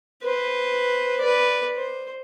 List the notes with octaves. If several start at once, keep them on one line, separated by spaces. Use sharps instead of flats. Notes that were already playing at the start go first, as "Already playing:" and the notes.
B4 C5
B4 D5
C5